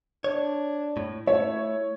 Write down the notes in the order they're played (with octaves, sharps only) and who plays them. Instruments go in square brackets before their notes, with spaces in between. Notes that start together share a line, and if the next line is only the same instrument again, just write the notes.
[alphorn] D4 [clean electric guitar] C#5
[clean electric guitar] A2
[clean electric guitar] A3 [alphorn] E4 [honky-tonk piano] C#5